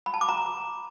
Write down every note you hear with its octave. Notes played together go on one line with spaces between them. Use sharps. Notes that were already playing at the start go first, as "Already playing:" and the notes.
B5
A5
D6
A#5